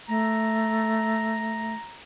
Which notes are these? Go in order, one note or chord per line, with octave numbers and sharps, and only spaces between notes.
A3 A#5